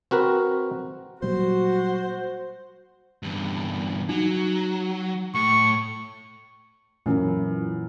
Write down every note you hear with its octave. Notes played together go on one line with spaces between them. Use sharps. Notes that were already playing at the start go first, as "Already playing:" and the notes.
C4 F#4 A#4 B4
A#2 F#3 G3 F#4 C5
E2 G2
F#3 D#4
A2 C#6
F#2 A#2 E3 E4